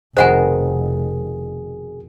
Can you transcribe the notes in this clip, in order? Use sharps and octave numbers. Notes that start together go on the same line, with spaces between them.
F1 F2 B2 D#3 G#4 C5 F#5 G#5